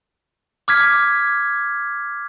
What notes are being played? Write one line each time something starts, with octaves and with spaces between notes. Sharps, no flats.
D6 F6 G#6 B6